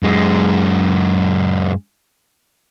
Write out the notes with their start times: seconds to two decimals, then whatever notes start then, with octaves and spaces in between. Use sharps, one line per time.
0.03 F#2 G#3